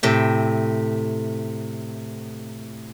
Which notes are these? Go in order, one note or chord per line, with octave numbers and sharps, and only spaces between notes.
A2 C3 G5